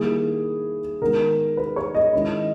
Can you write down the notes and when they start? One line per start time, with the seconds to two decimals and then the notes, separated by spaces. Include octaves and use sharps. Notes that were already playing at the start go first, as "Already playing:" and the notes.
Already playing: D#3 G3 A#3 E4 G#4
1.01 D#3 G#3 B3 A#4
1.57 B4
1.76 C#5
1.95 D#5
2.13 D#3 G#3 C#4 E4